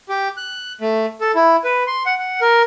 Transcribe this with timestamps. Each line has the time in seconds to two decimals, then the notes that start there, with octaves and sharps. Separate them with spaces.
0.09 G4
0.37 F#6
0.81 A3
1.21 A4
1.35 E4
1.64 B4
1.87 C6
2.06 F#5
2.19 F#5
2.41 A#4